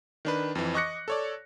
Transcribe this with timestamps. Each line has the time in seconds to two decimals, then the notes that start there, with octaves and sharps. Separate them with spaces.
0.25 D#3 D4 B4
0.55 F2 E3
0.74 D#5 C#6 D6 F#6 A#6 C#7
1.08 A4 C#5 D5